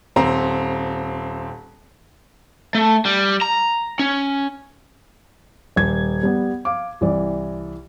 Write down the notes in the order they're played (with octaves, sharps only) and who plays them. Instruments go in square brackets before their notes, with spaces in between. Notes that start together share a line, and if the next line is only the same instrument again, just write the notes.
[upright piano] D#1 C4 A#5
[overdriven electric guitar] A3
G3
A#5
C#4
[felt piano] D#1 G#6
G3 B3
F5 D6
C2 E3 D5